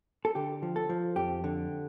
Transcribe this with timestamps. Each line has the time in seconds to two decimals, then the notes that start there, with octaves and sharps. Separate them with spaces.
0.25 A4
0.35 D3 G4
0.62 F3
0.76 A4
0.89 F3
1.16 F2 G4
1.44 D3